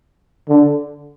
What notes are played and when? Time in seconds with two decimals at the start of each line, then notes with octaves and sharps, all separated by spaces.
0.49 D3